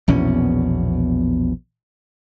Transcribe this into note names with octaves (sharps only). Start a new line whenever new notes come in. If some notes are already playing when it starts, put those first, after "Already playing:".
A#1 E2 B2 C#4